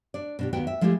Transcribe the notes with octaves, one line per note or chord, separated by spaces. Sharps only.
D4 D5
B2 D4 G4
D#2 B3 F#4 G5
E5
F3 G#3 A3 E4 G4